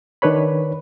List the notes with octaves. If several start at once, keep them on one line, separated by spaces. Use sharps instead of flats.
D#3 D4 B4 C#5 B5